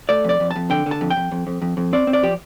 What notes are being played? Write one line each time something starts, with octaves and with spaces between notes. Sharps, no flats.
A3 D5
F2 D5
F2
A5
F2
D3 G5
D3
A5
F2
G5
F2
F2
F2
F2
F2
C4 D5
C4
D5
F3 G4